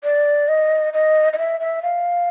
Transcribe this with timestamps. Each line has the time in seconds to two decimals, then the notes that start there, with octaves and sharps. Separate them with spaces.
0.04 D5
0.48 D#5
0.93 D#5
1.33 D#5
1.38 E5
1.60 E5
1.83 F5